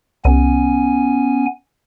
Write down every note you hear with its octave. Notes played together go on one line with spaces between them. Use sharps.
C2 B3 C#4 G#5